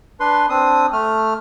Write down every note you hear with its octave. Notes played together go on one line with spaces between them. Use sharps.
D4 B4 C6
C4 D4 D#6
A3 F6